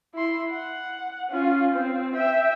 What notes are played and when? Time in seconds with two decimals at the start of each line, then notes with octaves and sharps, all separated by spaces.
0.15 E4 C6
0.51 F#5
1.31 C#4 F4
1.73 C4
2.15 E5 G5